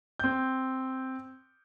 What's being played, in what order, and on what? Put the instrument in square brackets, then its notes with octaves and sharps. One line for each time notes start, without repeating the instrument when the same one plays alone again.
[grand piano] C4 G6